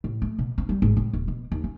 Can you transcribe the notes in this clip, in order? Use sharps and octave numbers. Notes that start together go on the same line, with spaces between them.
A2
A3
B2
C4
G3
G#1
A2
D#1
B2
D#2
C#4